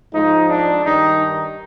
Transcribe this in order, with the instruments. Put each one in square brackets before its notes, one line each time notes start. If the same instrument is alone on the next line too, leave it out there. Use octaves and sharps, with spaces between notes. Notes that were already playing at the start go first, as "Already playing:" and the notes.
[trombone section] G#2 F3 G#3 D#4
D4
G2 D#3 D#4